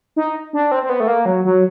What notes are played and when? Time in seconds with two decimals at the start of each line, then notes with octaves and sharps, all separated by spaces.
0.16 D#4
0.53 D4
0.72 C4
0.83 C4
0.89 B3
1.00 A3
1.08 A#3
1.25 F#3
1.45 F#3